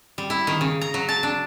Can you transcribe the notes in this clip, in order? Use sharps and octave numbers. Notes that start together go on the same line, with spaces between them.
G3
E4
D#3
C#3
A#5
F#3
A5
D4